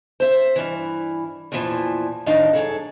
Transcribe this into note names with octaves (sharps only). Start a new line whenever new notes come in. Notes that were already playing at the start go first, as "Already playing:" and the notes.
C5 E5
G2 E3
E2 A#2 E3 F3
F2 A2 D#3 D4 D#4 F5
F#2 A#2 G#4 A4